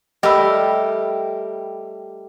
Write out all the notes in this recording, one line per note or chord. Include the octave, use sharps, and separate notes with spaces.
G3 A3 G4 A#4 D#5 B5 E6